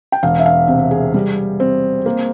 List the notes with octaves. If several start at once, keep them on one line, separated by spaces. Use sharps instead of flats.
G5
E1 F5
E5
F5
C3
G#4
G3
C4
A#3